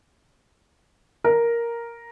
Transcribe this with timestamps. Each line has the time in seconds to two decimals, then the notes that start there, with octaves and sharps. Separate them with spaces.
1.24 A#4